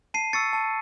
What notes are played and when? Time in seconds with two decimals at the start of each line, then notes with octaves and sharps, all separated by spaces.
0.14 A5 C7 D#7
0.33 C#6 E6 A6 C#7
0.53 A5